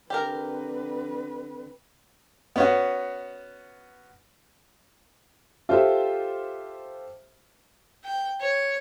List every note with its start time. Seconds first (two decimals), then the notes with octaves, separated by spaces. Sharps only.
0.10 D3 C4 G4 A#4 B4
2.56 B3 C#4 F#4
5.69 F4 G4 A4 C5 E5
8.05 G5
8.40 C#5